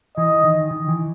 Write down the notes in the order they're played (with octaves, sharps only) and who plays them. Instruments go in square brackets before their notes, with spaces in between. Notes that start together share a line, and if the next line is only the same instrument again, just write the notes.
[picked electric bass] E3 [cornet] D#5
[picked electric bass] D#3
D#3
E3